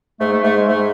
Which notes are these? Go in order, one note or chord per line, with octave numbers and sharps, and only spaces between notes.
G#2 A3
A3
G#2 A3
G#3
G#2 A3